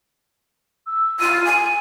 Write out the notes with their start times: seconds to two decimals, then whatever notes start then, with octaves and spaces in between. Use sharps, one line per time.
0.87 E6
1.20 F4 D#7
1.45 G#5